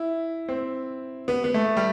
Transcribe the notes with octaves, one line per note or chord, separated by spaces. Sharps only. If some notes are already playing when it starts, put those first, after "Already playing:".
Already playing: E4
C4
B3
B3
A3
G3